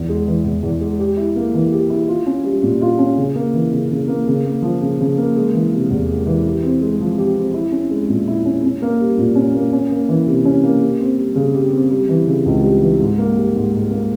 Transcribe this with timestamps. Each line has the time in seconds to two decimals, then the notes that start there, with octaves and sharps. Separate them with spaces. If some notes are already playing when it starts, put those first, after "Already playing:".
Already playing: E2
0.09 G#3
0.27 E3
0.44 E2
0.63 E2
0.80 G#3
0.99 G4
1.17 E4
1.36 A#3
1.54 E3
1.72 G4
1.90 E4
2.08 F4
2.26 C#4
2.44 G3
2.62 A#2
2.81 F4
2.99 C#4
3.17 C#3
3.35 A#3
3.54 E3
3.72 C#3
3.91 C#3
4.08 A#3
4.27 C#3
4.44 A#3
4.62 F3
4.81 C#3
5.00 C#3
5.18 A#3
5.36 G#3
5.53 E3
5.72 C3
5.90 E2
6.09 G#3
6.26 E3
6.45 G4
6.63 C4
6.81 G#3
7.00 F3
7.18 G4
7.36 C4
7.54 E4
7.72 C#4
7.90 G#3
8.09 A#2
8.27 E4
8.45 C#4
8.64 C#4
8.82 A#3
9.00 G3
9.18 A#2
9.35 C#4
9.55 A#3
9.73 C#4
9.91 A#3
10.09 E3
10.26 C3
10.45 C#4
10.63 A#3
10.82 G4
11.00 C4
11.18 G3
11.35 C#3
11.54 G4
11.73 C4
11.91 G3
12.09 E3
12.27 C#3
12.46 C#2
12.63 G3
12.82 E3
12.99 G#2
13.18 A#3
13.36 G3
13.55 G#2
13.73 G#2
13.91 A#3